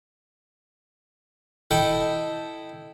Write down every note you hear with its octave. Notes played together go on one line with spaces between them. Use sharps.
E4 A4 D#5 G5 A5